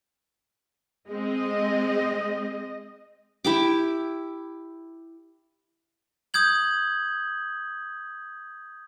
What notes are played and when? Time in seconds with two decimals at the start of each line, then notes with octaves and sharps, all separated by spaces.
1.10 G#3 C4 D#5
3.44 E4 G4 D6
6.34 D#6 G6 G#6 F#7